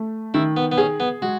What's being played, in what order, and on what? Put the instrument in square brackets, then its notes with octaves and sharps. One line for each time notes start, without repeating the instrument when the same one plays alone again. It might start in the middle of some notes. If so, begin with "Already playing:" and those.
Already playing: [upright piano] A3
[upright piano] D#3 [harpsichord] E4
[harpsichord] B3
B3
[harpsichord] C#4 [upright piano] G#4
[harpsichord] B3
[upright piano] G#3 [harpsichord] F#4